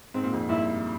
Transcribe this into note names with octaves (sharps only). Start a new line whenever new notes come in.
G#2 C4
A#2
F2 G#2
G2 A#2 E4